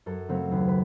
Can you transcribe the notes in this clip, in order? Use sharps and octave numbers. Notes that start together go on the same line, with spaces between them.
F#2 A4
C#3 F#3 A3 C4
D#2 B4
B4